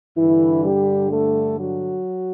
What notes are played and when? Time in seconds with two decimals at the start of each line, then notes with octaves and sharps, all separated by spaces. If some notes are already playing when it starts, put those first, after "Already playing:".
0.17 G2 D3 E3 E4
0.64 G3 G4
1.11 A3 A4
1.58 F#3 F#4